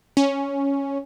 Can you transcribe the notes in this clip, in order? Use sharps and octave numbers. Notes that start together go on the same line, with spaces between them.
C#4